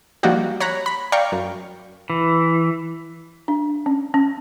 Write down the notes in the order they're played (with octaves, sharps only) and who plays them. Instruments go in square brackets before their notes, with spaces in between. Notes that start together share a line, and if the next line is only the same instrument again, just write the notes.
[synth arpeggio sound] F3 G3 A#3 D#4 F#4 G4
C#5 A#5 B5 F#6
B5
D5 F5 G5 A#5 C#6
F#2
[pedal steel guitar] E3
[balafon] D4
C#4
C#4